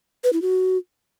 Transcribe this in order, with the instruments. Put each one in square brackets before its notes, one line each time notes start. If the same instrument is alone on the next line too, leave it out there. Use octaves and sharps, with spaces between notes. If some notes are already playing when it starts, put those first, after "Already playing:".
[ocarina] B4
E4
F#4